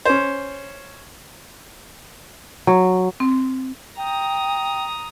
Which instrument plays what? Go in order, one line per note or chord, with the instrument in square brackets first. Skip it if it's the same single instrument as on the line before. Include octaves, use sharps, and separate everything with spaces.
[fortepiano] C#4 C5
[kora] F#3
[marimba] C4
[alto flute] G5 [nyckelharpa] A#5 D#6